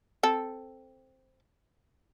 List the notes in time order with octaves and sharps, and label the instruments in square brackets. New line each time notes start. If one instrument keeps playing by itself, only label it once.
[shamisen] C4 A4